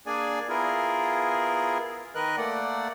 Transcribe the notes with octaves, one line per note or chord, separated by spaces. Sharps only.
A#3 D4 G#4 D5 G#5
B3 E4 F4 G#4 A#4
D#3 A#4 B4 D#5 F#6
A3 A#3 D5 F#5